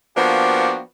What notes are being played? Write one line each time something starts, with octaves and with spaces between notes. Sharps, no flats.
F3 A#3 B3 D4 F#4 G4